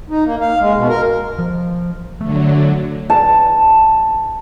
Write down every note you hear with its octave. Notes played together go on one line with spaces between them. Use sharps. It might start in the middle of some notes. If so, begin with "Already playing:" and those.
D#4
A#3
F5
G#3
B2
A#4
F3
D3 F#3 A3
A5